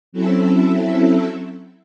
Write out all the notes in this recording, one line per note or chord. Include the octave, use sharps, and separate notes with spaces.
F#3 C4 C#4 E4 A4 E5